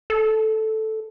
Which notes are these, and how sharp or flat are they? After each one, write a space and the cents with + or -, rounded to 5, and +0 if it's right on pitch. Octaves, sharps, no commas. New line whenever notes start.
A4 -5